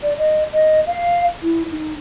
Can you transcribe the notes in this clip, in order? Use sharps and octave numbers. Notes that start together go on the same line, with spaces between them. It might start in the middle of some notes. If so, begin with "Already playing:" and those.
D5
D#5
D#5
F5
E4
D#4